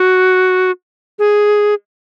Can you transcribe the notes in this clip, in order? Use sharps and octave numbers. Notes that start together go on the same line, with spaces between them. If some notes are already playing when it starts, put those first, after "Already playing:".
Already playing: F#4
G#4